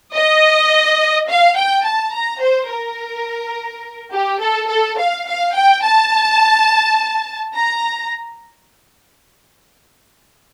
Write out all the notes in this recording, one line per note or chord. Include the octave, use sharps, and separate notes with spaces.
D#5
F5
G5
A5
A#5
C5
A#4
G4
A4
A4
F5
F5
G5
A5
A#5